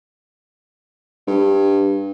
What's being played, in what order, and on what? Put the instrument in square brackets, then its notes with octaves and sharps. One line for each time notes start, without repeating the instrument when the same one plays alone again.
[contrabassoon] G2